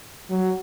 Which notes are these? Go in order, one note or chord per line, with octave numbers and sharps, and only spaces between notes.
F#3